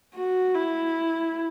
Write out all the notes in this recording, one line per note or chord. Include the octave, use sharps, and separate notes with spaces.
F#4
E4